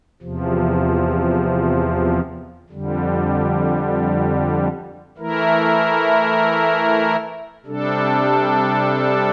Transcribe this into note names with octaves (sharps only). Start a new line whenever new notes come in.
E2 C3 F3
F2 D3 G3
E3 A3 E4 A#4
C3 G3 D4 A4